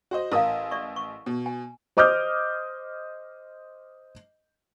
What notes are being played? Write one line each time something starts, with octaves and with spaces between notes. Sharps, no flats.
F#4 C5 D#5
A1 E4 A#4 F5 D#6
D5 E5 C#6
C#6
B2
G#5
C5 D#5 D6 D#6 F6 G6